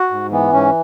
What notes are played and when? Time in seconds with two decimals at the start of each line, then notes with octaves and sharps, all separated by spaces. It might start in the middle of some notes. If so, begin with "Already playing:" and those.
Already playing: F#4
0.11 G#2
0.31 E3 B3
0.53 G#2 C#4